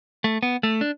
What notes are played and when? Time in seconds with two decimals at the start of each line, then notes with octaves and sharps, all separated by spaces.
0.24 A3
0.43 B3
0.63 A3
0.81 D4